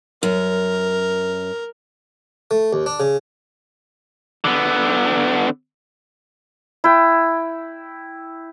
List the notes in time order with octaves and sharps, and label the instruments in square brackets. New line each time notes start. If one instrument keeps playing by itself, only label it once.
[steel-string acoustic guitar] F#2 [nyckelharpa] A#4
[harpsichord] A3
D#2
D4
C#3
[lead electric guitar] D3 B3
[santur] E4 G5